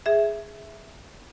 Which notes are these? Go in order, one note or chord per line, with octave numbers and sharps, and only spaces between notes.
G#4 E5